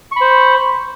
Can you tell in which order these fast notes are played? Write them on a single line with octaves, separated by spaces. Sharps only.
C#6 B5 C5